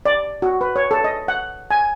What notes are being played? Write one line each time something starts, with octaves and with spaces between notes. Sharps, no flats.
D5
F#4
B4
C#5
A4
D#5
F#5
G#5